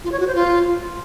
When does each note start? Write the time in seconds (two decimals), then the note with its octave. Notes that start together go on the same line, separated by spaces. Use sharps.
0.04 F4
0.12 C#5
0.20 F#4
0.27 C5
0.35 F4